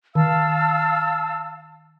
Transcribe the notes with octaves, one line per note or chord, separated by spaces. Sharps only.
D#3 F5 A5 E6